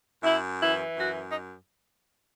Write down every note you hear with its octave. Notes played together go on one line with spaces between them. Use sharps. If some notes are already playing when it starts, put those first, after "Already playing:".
F#2 E4
E3 E4
F#2 F#4
D#4